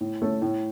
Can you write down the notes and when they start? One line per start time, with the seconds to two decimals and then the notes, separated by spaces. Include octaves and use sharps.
0.01 A2
0.22 A3 C#4 A4
0.42 A2